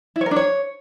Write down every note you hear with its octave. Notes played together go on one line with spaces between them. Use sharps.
E4
C#5
A#4
D4
C#5